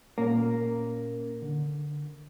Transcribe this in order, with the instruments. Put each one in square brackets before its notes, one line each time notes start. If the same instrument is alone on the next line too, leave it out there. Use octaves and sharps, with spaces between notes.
[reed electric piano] A#2 C#4 [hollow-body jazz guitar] A#3
[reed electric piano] D3